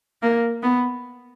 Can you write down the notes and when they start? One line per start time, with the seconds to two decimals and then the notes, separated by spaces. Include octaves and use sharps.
0.23 A#3
0.63 B3